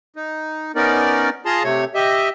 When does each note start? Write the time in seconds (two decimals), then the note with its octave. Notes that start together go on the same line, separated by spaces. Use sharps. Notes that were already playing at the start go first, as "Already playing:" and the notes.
0.16 D#4
0.75 B3 C#4 D#4 A#4 D5
1.46 F4 G#4 A5 A#5 C6
1.64 C3 A3 C#5
1.95 G4 D#5 E5